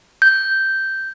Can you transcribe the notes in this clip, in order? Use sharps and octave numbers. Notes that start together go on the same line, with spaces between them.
G6